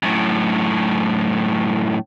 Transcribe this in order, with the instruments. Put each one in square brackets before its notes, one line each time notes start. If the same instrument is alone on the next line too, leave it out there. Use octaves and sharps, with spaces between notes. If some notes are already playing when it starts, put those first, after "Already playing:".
[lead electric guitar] F#2 A2